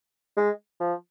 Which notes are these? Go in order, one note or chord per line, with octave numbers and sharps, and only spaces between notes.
G#3
F3